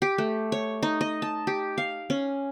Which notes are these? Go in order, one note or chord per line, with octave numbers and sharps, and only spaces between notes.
G4
A3
C#5
D#4
D#5
A5
G4
F5
C#4